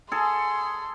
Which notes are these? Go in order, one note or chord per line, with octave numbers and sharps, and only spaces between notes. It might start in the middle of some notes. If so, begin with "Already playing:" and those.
G#4 A4 C6